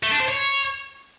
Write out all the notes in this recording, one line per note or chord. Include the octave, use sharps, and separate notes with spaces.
A3
D4
C5
C#5